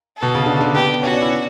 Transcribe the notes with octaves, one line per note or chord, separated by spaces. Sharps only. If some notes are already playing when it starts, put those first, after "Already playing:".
A4
B2
C#3
D3
D3
B3 G4
C#4 F#4
D4
E4
D4